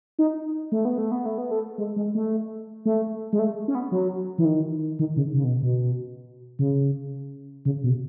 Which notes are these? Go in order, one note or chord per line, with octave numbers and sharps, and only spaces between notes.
D#4
A3
B3
A3
B3
A3
B3
A3
G#3
G#3
A3
A3
G#3
A3
C#4
B3
F#3
E3
D#3
D#3
C#3
C#3
B2
B2
C#3
C#3
B2